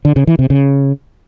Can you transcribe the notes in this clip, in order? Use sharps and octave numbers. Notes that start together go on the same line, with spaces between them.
D3
C#3
E3
C3
C#3